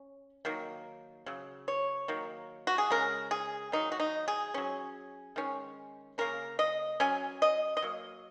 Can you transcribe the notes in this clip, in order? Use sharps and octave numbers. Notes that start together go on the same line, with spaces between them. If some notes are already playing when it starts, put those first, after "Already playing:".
Already playing: C#4
D#3 F#3 A#3
C#3 F#3
C#5
D#3 F#3 A#3
F#4
G#4
C#3 G#3 C#4 A#4
G#4
D#3 F#3 A#3 D#4
F#4
D#4
G#4
F#3 C#4
D#3 G#3 C#4
C#3 A#3 C#4 A#4
D#5
F#3 C#4 G#5
D#5
D#5
F#3 A#3